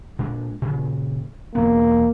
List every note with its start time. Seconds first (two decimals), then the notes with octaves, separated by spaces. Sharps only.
0.19 A#2 G#3 D4
0.62 A#2 C#3
1.55 E2 B2 A#3 B3